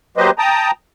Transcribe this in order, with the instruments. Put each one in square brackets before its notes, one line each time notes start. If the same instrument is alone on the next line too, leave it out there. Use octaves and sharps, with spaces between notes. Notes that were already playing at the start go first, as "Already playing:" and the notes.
[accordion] F#3 A#3 G4 B4 C5 D#5
G5 A5 A#5 D#6